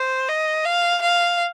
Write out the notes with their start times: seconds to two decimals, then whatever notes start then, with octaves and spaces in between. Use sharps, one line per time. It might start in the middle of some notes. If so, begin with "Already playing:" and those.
Already playing: C5
0.29 D#5
0.64 F5
1.02 F5